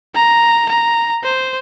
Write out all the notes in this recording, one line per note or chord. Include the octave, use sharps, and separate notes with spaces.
A#5
A#5
C5